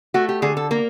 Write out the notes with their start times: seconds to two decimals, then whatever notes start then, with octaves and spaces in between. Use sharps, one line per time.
0.14 A3 F#4
0.29 G4
0.42 D3 G#4
0.57 A4
0.71 A#3 A#4